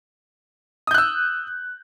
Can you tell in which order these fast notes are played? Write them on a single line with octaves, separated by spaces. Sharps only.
D#6 G6 F#6 E6